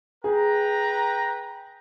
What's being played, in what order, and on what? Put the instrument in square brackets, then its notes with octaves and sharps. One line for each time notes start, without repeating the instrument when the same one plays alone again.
[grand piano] G#4 [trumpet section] B4 G5 A#5